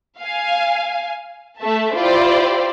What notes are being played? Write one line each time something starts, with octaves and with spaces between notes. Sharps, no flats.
F5 G#5
A3 E5 A5
E4 F4 G4 C5 D5